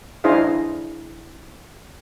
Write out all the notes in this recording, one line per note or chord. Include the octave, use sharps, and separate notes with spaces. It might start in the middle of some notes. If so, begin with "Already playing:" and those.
D4 E4 G#4 C5 D#5 F5